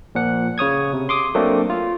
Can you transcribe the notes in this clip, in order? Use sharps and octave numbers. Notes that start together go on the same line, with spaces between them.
A#2 F3 F#5
C#3 C#5 D#6 G#6
C3
C6 D6 D#6
F#3 A3 A#3 C4 D4
F4